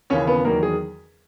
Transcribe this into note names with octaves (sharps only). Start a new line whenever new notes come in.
D#2 C#3 E3 C#4 C#5
B3 B4
E2 D#3 F#3 A#3 A#4
G#4